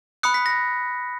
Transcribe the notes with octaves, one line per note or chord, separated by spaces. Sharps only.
B5 D#6 F#6 C#7
B6
A#6